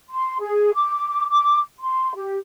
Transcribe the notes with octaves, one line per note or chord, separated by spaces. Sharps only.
C6
G#4
D6
D6
C6
G4